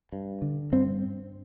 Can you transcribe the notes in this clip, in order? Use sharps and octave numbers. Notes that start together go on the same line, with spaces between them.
G2
D3
G2 C4